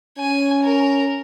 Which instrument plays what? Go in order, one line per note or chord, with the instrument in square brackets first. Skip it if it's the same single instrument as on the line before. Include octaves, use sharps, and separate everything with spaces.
[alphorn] C#4 [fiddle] G#5
[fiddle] A#4